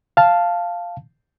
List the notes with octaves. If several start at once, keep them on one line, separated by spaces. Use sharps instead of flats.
F5 A5